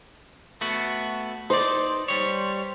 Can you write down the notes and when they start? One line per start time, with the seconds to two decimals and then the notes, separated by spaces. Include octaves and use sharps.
0.61 A3 B3 F#4
1.50 D#4 C5 D5
2.08 G3 C#5